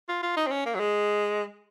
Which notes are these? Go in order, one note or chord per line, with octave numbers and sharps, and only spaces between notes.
F4
F4
D#4
C4
C#4
A#3
F#3
G#3